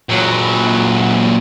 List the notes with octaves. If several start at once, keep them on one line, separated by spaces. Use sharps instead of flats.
A#2 F#3